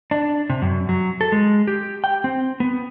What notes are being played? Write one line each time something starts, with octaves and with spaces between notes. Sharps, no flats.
D4
C3
F#2
F#3
A4
G#3
G4
G5
C4
B3